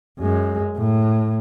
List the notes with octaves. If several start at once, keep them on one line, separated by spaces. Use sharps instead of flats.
F#2 G#3
A2